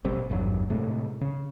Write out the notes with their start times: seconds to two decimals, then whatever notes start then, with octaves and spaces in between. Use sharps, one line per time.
0.05 A1 B2 G3 C4
0.30 G#1 E2 G2 F#3
0.70 A2 C3 G#3 A3
1.21 C#3